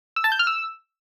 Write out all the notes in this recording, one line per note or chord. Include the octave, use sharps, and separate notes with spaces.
E6
A5
G6
F6
E6